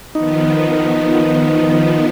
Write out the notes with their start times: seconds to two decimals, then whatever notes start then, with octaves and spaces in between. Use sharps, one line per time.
0.15 D#3 F3 B3 D#4